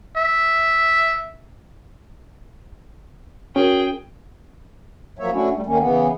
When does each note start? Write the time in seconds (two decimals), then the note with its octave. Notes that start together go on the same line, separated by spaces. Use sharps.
0.17 E5
3.56 C#4 F#4 G#4 A#4 G5
5.19 F3 F#3 A#3 C#5 E5
5.32 A3 C#4 D4 E4 F#4
5.53 G3 A3
5.66 D2 D#3 A#3 C#4
5.80 C#3 E3 B3